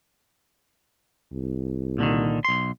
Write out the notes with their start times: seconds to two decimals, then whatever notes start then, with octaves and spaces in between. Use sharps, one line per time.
1.32 C2
1.98 A#2 D3 D#3
2.45 B1 C6